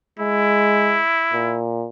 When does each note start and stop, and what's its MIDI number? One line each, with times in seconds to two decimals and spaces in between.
0.19 1.01 56
0.19 1.60 64
1.33 1.87 46